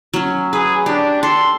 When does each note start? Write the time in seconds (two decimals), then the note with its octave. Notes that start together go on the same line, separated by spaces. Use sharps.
0.14 F#3 C#4
0.53 G#4 B4
0.86 D4 G4
1.23 A4 C6